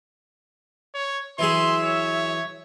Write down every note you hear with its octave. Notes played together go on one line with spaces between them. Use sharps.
C#5
E3 F#3 G#4 E5 C6
C#5